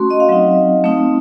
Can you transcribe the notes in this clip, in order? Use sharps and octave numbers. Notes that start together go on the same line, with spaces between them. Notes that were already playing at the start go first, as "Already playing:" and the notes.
Already playing: A3 C#4 F#4 C6
D#5
F5
F#3 C4 D#4 D#5
A3 C4 D#4